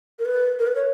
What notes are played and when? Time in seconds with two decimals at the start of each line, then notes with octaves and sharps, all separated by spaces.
0.19 A#4
0.25 B4
0.59 A#4
0.67 B4
0.75 C#5